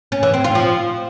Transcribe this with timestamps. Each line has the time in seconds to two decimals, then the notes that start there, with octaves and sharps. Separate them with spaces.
0.12 C#4
0.23 E3
0.34 C4
0.44 F4
0.55 F3